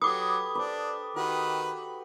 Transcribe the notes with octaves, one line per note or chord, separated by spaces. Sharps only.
F#3 G4 A4 B4 D6 D#6
D4 B4 C5
D#3 F#4 G4 B4